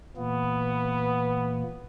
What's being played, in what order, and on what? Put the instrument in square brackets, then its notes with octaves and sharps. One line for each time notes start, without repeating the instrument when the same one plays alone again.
[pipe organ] A#2 E3 A#3 [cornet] B3